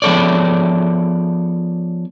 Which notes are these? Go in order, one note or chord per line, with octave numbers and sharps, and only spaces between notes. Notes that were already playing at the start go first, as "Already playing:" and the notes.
F3 B3 G#4 A4 C#5 D5